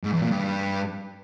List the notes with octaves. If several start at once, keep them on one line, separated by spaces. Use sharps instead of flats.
G#2
E2
A#2
G2